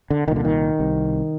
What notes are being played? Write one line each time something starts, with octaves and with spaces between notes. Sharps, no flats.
D3
C2 A#2 D#3
D3
D#3
C2 C3